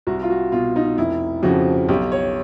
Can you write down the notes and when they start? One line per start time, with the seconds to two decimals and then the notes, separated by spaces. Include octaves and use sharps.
0.07 C2 F#4
0.23 F4
0.30 F#4
0.52 B2 F4
0.76 D#4
0.98 F1 E4
1.43 F2 C#3 F3 F#4
1.88 B1 G4
2.12 C#5